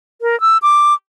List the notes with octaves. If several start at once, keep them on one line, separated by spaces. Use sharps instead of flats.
A#4
E6
D6